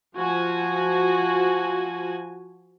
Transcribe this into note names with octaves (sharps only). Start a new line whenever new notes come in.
F3 F#4 G#5